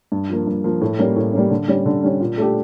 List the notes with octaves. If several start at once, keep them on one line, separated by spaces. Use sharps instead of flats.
G2
F3 A#3
G2
F3 A#3
A2
G3 A#3 C#4
A2
G3 A#3 C#4
D3
G3 C#4
D3
G3 C#4
A#2
A3 D4 G4